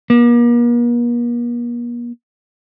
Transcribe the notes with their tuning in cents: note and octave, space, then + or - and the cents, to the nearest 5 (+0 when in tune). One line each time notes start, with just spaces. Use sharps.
A#3 +45